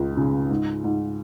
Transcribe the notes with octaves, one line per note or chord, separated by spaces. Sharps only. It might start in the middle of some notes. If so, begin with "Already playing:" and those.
Already playing: C#2
C#3
G#2
G#2